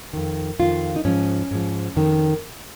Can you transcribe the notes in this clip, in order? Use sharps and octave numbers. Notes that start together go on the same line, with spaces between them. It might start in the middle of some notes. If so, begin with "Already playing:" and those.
F2 D#3
F2 D#3 F4
D#4
G#2 F3 C#4
G#2 F3
F2 D#3